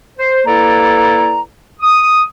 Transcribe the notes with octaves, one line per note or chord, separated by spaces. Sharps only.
C5
A#3 E4 A4 B4 D5 A#5
D#6